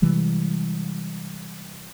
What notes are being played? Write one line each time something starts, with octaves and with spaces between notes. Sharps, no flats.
C3 E3 G3 G#3